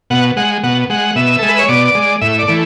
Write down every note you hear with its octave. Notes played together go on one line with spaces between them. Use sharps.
B2 F#5
G#3 F#5
B2 F#5
G#3 F#5
B2 E5
G#3 A4
B4
C#5
B2 D5
G#3
A2 E5
D5
E3 A3